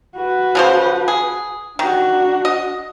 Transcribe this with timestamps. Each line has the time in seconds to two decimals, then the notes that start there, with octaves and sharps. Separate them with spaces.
0.15 F#4 B4
0.55 C#3 F3 C5
1.08 G#4
1.79 D#3 D4 F#4
2.45 D#5